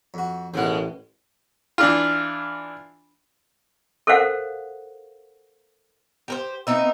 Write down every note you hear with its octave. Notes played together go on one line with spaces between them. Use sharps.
F2 F#4
A1 D#2 B2 G#3 C5 F#5
E3 D4 F4
A4 A#4 C5 F5 F#5
G4 A#4 C5
B3 C4 D#4 E5